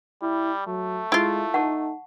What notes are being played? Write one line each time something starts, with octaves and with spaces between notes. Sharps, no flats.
G3 E4
F#3 A3
G#3 E4 F4
D#4 F#5 A5 C#6